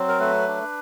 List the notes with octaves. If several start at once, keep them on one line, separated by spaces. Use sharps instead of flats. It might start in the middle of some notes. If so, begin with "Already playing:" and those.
Already playing: F#3 C4
A#4
A3 B4
D4